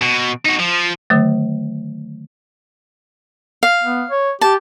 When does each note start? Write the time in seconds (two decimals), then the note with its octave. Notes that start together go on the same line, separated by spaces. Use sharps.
0.03 B2
0.46 D#4 F#4
0.60 F3
1.10 D3 D#3 F#3 A3
3.63 F5
3.83 B3
4.11 C#5
4.41 G4 A5